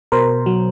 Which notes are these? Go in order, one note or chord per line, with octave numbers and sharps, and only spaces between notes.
B2 A#4 C5
F#3